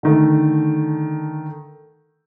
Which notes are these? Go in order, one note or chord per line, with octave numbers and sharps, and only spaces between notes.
D3 D#3 A3